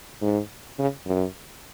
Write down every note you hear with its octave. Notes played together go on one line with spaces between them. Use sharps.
G#2
C#3
F#2